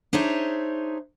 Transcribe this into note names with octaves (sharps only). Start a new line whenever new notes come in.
D4 D#4 G#4 C5 C#5 E5